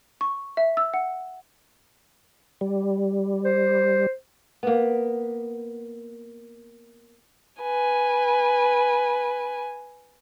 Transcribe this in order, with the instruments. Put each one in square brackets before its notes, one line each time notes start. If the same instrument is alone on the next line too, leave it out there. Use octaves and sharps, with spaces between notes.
[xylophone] C#6
E5
E6
F#5
[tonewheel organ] G3
[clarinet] C5
[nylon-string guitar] A#3 B3
[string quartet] B4 G#5